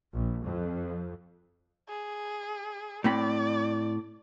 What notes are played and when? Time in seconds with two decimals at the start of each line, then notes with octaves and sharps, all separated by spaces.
0.13 A#1
0.45 F2
1.89 G#4
3.04 A2 C4 D5 B5